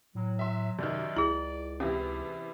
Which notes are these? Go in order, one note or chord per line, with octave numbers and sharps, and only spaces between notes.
A2 F#3
E5 C6
F#2 C3 D#3 D5
C#2 E4 G#4 F#7
E2 C3 C#4 E5